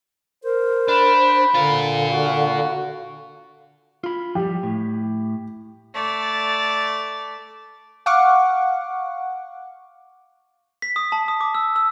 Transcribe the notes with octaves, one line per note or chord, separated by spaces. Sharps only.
A#4 C5
D4 B5
D3 F4 A#4 F5
F#4
F4 B5
F3 G3 G4
A2
A3 D5
F5 F#5 C#6 D6
B6
D#6
A5
D#6
D6
E6
E6